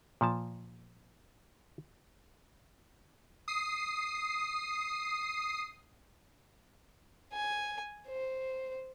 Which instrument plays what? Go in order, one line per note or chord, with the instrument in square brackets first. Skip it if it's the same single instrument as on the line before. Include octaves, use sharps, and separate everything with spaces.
[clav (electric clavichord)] A#2 F3 A5
[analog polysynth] D#6 C7
[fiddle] G#5
C5